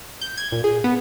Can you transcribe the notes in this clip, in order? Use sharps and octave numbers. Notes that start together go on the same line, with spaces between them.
G6
G#6
A#2
G#4
B3